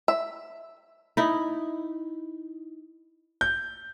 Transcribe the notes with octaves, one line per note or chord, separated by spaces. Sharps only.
E5
D#4 E4
G6